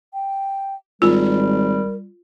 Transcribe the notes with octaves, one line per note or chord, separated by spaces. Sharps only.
G5
G#1 G3 F4 A#4